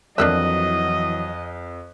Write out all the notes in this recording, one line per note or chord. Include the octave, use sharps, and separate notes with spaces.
F2 E3 F#3 D4 A#4 D#5 E5 F#6